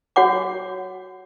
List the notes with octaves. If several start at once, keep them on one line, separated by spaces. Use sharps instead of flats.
F#4 C#5 F#5 D6